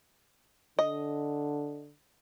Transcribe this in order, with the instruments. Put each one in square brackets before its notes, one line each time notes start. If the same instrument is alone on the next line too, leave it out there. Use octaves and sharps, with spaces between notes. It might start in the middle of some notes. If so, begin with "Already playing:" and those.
[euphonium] D3 [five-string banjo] D#5